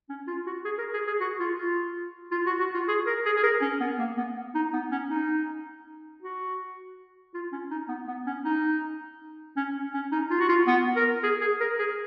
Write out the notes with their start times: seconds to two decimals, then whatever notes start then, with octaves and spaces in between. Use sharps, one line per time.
0.09 C#4
0.27 F4
0.46 F#4
0.65 G#4
0.78 A#4
0.93 G#4
1.07 G#4
1.20 F#4
1.39 F4
1.58 F4
2.31 F4
2.46 F#4
2.59 F#4
2.74 F4
2.88 G#4
3.06 A#4
3.25 G#4
3.36 G#4
3.43 A#4
3.61 C#4
3.80 B3
3.99 A#3
4.17 B3
4.55 D#4
4.73 B3
4.91 C#4
5.10 D#4
6.22 F#4
7.34 F4
7.52 C#4
7.70 D#4
7.88 B3
8.08 B3
8.27 C#4
8.45 D#4
9.56 C#4
9.94 C#4
10.12 D#4
10.30 F4
10.40 F#4
10.49 F4
10.67 B3
10.96 A#4
11.23 G#4
11.41 G#4
11.60 A#4
11.79 G#4